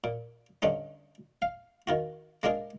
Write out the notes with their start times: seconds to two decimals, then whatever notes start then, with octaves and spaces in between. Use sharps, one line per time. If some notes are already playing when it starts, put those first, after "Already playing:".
0.04 A#2
0.62 G2 D3 C#4 D#4
1.42 F5
1.87 D#3 F4 F#4
2.43 G#3 A#3 D4 F4 G#4